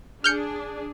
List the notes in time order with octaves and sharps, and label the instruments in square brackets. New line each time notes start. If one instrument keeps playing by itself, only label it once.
[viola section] D4 G#4 [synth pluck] F6 G6 C#7